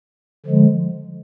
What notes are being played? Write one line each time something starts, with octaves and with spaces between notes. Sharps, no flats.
D3 F3 G#3